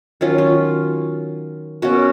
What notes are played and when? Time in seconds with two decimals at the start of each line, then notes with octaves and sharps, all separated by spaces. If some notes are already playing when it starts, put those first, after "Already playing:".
0.21 D#3 F#3 C#4 F4
0.38 F4
1.82 B2 A#3 C#4 F#4